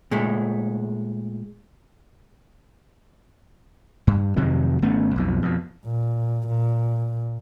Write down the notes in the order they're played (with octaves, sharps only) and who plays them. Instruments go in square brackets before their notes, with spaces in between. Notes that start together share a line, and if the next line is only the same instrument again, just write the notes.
[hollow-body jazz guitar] A#2 G#3 A3
[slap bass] G2
F2 C3 D#3 F#3
G#1 A3 B3 C#4
B1 F2 B2
F2 B2
[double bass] A#2
A#2